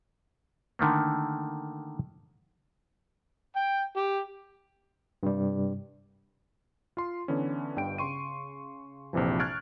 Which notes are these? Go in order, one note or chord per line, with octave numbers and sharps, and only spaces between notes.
D3 D#3 A3 A#3
G5
G4
G2 C3 G3
F4 C6
D3 E3 B3 C#4
G1 G2 G5 D7
C#3 C6 C#6 D#7
A#1 F2 C3 E3 F3
C#6 F6 F#6 G#6 A6 D7